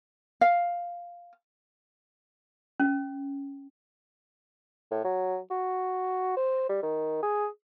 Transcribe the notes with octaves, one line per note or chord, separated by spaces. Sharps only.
F5
C#4
A2
F#3
F#4
C5
G3
D#3
G#4